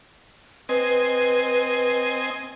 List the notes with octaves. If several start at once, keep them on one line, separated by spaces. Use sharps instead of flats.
C4 B4 D#5 G#5